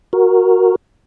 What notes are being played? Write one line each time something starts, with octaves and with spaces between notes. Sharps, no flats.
F#4 A#4